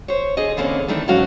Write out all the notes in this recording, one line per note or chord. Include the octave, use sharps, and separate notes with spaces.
C5 C#5
D3 G#4 D#5
E2 D3 A#3 C4 C#4
D#3 E3 A3 D4
D2 G#2 F#3 C#4 F#4 F5